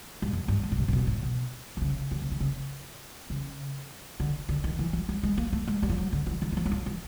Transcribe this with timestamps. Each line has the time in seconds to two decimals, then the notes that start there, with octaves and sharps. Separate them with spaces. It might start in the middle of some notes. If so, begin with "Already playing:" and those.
0.22 G2
0.33 F#2
0.48 G2
0.63 G#2
0.72 B2
0.78 C3
0.88 A#2
0.93 B2
1.07 A2
1.23 B2
1.77 D3
1.82 C#3
2.11 D3
2.22 C#3
2.32 D3
2.40 C#3
3.30 C#3
4.20 D3
4.49 D3
4.64 D#3
4.79 E3
4.93 F3
5.09 G3
5.23 G#3
5.37 A#3
5.53 A3
5.68 G#3
5.82 G3
5.89 F3
5.98 F#3
6.13 D3
6.27 E3
6.42 D#3
6.52 F#3
6.57 F3
6.66 F#3
6.71 F3
6.86 E3